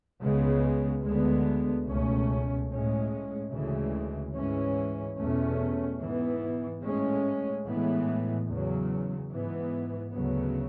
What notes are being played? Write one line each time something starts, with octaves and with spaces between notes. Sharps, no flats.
C#2 C#3 G#3 B3
D2 D3 G#3 B3
C#2 B2 A3 C#4
A2 G#3 C#4
D2 C#3 E3 G#3
G#2 E3 G#3 C#4
E2 B2 A3 C#4
G#2 E3 B3
A2 G#3 C#4
A2 E3 G#3 B3
E2 C#3 F#3
G#2 E3 B3
D2 C#3 F#3 B3